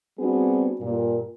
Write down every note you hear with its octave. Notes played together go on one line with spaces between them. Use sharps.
G3 B3 C4 D4 F#4 G#4
G2 A#2